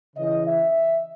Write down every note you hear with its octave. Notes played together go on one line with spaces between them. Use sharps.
C#3 E3 D#5
E5